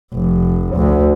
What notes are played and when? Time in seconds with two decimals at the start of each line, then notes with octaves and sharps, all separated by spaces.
0.13 F1
0.76 D2